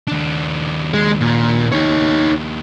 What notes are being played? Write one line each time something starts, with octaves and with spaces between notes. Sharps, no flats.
D#2 D4
G#3
A#2
D#4 C#5